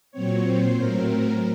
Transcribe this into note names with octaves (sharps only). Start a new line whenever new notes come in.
A#2 F#3 C4 C#5
C5
A2 F#3 A3 C4 A#4
A#4